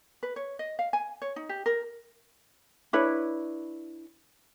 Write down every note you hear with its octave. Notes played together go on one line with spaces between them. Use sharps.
B4
C#5
D#5
F5
G#5
C#5
D#4
G4
A#4
D4 E4 B4 C#5